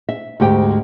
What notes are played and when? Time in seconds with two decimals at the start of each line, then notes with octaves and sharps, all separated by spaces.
0.09 E5
0.40 D2 G#2 G4 G5